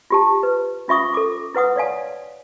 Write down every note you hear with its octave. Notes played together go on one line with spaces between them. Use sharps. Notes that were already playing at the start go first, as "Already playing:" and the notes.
F4 G4 A5
B4
C#4 F4 E5 C#6 D#6
A4 D6
E4 B4 F#5 D#6
C#5 D5 F5 G#5